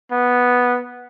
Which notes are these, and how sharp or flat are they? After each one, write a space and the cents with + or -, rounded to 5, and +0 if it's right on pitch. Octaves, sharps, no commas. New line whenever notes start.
B3 -5